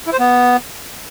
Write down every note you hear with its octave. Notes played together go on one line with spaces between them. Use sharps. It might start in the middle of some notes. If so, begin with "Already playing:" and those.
E4
C5
B3